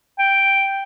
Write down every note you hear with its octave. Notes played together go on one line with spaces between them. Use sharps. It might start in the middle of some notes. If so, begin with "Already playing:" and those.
G5